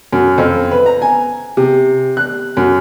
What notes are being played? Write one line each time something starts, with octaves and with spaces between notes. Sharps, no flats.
F#2
F2
B4
A#5
G#5
C3
F#6
F#2